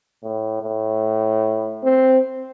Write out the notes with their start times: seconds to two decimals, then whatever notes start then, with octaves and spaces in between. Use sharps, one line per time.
0.23 A2
0.63 A2
1.84 C4